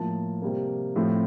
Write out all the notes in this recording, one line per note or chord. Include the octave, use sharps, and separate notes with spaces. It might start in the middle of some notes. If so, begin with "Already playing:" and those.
Already playing: A2 F3 A#3 A5
C3 G3 A#3
A2 F3 A3 C4